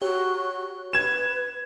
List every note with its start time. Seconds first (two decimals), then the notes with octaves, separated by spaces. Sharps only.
0.02 F#4 G4 C#5
0.93 B4 G#6 E7